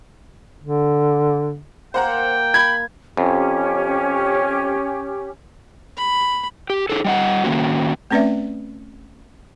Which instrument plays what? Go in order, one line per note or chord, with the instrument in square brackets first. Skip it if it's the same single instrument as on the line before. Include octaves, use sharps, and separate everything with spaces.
[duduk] D3
[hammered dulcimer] A#3 [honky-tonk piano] C5 F#5 A#5 [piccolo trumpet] G5
[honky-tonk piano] B5 [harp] G#6
[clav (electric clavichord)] F2 [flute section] C#4 G4
[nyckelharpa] B5
[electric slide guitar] G4
D#4 G#4 A4
G3 D#5 F#5
D#3 A#3 C#4 F#4
[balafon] A3 C4 C#4 B4 D5 E5